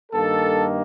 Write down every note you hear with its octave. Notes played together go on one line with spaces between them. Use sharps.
G2 D#3 A#3 A4